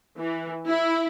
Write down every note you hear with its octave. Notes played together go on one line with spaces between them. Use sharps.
E3
E4